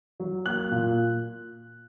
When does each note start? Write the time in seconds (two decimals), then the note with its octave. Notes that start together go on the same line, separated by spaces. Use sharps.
0.20 F#3
0.46 A#3 F#6
0.71 A#2